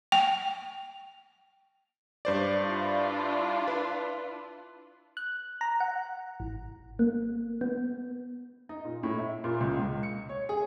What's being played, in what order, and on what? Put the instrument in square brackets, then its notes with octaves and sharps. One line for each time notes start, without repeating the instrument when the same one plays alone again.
[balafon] G5
[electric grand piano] G2 C5 D5
[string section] D4 E4 F4
[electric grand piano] B4
[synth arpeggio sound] F#6
A#5
F#5
G#1
A#3
B3
[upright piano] D#4
A#2
A2
E5
A#2
C#2
C#2
C#7
C#5
G#4